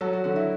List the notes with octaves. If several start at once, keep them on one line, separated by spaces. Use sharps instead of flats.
F#3 F#4 A4
F#4
D3 F#4
E4